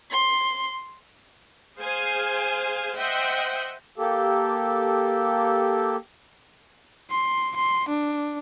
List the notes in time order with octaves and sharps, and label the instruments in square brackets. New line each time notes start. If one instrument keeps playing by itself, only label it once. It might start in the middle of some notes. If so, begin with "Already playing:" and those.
[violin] C6
[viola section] G#4 C5 F5 G#5
C5 D#5 E5 F#5 G5
[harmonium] A#3 G4 A4
[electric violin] C6
C6
D4